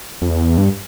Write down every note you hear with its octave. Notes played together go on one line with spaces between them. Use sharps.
F2
E2
G2